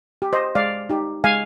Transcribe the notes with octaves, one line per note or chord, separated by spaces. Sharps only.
G4
C5 D#5
G#3 D5 F5
D#4 G4
G#3 F5 G#5